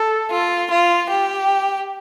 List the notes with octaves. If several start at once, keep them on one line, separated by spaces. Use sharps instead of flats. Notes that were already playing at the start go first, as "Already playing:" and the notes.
Already playing: A4
F4
F4
G4